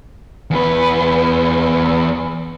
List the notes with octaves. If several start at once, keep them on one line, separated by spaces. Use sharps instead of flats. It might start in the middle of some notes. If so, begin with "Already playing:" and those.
E2 B4